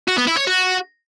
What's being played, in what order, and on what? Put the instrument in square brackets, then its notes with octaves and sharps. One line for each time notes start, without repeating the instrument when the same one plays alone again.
[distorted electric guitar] F#4
B3
E4
C#5
F#4